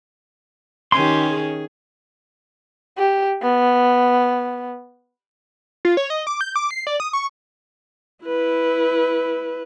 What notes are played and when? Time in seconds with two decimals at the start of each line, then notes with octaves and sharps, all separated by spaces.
0.92 D#3 C#4 G4 G#5 C6
1.30 G#4
2.98 G4
3.42 B3
5.85 F4
5.97 C#5
6.10 D#5
6.27 D6
6.41 G6
6.56 D6
6.71 C7
6.87 D5
7.00 D#6
7.13 C#6
8.25 E4 B4